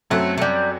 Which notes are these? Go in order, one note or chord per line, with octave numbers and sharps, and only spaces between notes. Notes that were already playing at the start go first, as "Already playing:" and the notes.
F#2 F#3 A3 C4 F#4 A4
A3
G3